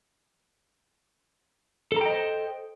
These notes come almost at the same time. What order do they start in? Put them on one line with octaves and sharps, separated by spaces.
A4 A#5 G5 D#5 C5